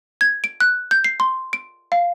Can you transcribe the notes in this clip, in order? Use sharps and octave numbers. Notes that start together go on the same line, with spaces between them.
G#6
D7
F#6
G6
C7
C6
D7
F5